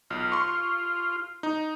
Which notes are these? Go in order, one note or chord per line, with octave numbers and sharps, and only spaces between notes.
B1 F4
C6 C#6
D#4